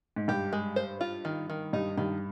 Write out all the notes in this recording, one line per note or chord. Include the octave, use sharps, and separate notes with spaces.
G#2
G2 G4
G#3
C5
F4
D#3
D#3
G2 D#4
G2 D#3